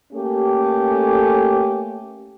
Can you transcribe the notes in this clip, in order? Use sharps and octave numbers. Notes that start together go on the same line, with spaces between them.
A3 A#3 C#4 G4 A4